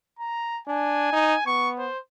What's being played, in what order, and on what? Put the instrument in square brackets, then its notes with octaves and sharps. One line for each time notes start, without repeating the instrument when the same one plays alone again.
[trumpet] A#5
[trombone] D4 [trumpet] G#5
[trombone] D#4
[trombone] B3 [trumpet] C#6
[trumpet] C5